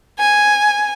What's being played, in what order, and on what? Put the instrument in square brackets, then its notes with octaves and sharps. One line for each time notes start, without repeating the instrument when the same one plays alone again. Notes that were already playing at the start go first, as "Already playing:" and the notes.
[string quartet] G#5